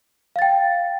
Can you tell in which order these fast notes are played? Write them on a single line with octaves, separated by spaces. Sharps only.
F5 A6 G5